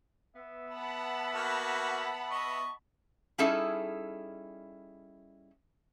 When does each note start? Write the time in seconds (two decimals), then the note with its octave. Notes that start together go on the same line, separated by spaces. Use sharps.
0.35 B3 E5
0.72 F#5 A5 B5
1.35 A#3 F#4
2.31 D#5 C#6
3.38 G3 C#4 D#4 E4 G#4 A4